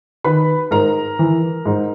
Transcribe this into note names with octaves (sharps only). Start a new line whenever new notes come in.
D#3 B4 B5
G#2 A#4 A#5
E3
G#2